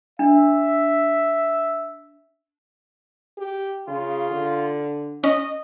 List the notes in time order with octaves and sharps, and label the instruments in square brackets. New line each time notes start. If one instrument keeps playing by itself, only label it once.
[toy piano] D4 [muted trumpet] E5
[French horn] G4
[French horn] C#3 [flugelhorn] F4
[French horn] D3
[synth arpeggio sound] C#4 [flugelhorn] D#5